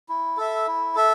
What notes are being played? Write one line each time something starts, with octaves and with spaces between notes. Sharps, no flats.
E4
A4 E5
E4
A4 E5